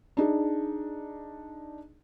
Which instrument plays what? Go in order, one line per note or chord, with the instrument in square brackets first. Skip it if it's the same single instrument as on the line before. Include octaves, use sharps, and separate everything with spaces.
[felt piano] D4 D#4 G#4